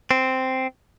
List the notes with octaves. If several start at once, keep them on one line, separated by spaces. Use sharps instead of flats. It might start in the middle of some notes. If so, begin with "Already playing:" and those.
C4